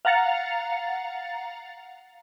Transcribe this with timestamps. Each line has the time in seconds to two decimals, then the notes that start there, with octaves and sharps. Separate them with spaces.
0.05 F5 F#5 A#5 A6 C#7 F7